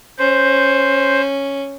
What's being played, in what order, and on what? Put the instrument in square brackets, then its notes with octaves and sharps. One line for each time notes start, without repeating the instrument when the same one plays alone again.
[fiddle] C#4 [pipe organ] C5